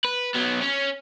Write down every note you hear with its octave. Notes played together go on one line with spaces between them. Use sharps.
B4
F#3 B3
C#4